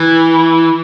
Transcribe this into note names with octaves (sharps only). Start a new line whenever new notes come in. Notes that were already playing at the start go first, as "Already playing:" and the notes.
Already playing: E3